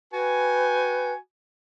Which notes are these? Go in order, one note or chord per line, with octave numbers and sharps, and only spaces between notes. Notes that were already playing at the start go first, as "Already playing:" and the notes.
F#4 B4 G5 G#5